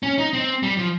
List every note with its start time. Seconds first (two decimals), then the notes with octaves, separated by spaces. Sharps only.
0.03 C#4
0.18 D#4
0.33 C4
0.63 G3
0.77 F3